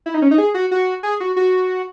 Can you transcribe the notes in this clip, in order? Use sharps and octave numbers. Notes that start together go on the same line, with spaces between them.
E4
D#4
C#4
D#4
G#4
F#4
F#4
G#4
F#4
F#4